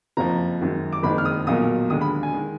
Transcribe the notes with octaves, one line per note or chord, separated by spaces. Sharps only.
F#1 F2 F3 A#5
F#2 D#3 G#3
D6
F#1 F2 D#3 G#3 B5
F6
D#6
B1 A#2 F#3 A#3 D#6
D#2 D3 G#3 D#6
B5
G#5
D#3 G#3